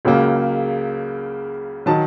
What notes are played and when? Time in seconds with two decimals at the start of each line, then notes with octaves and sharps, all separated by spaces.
0.05 C#2 C#3 F#3 A#3
1.86 D#3 F#3 A5